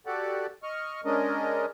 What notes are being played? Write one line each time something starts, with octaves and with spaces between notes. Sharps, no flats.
F#4 G4 A4 D5 F#5
D#5 C#6 F6
G#3 C#4 D4 A#4 D#5